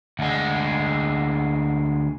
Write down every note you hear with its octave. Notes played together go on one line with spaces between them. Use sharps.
D2 G#3